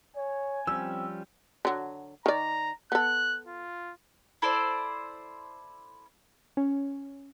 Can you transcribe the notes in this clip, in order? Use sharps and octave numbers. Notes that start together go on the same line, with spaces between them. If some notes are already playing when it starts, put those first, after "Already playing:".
C#5 G#5
F3 G3 C4 C#4 E6
D3 F#3
D#3 D5 A#5
B3 A4 F#6
F4
E4 A4 C5 D5
C#4